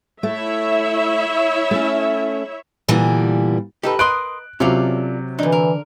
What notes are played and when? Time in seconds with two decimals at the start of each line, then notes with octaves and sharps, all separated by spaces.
0.23 A3 E4 C#5 E5
1.71 A3 C#4
2.88 A#2 D3 E3 G3 B3
3.83 D#4 G4 A4 B4
3.99 A#4 B4 D#5 C6 D#6 F#6 D7
4.60 C3 F#3 C#4 F4 A4 A#4 D5
5.39 D3 E3 D4 D#4
5.52 A#4